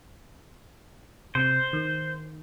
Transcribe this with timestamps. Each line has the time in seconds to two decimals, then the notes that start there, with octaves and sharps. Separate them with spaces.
1.35 C3 C5
1.73 D#3